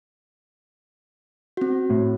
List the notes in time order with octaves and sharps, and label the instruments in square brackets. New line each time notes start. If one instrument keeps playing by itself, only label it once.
[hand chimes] C4 F#4
[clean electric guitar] A2